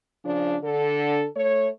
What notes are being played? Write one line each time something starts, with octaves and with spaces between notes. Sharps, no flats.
C#3 F3 D4
D3 A4
A3 C#5